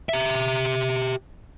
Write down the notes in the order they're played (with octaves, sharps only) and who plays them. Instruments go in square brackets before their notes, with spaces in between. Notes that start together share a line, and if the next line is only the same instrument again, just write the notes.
[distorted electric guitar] G4 E5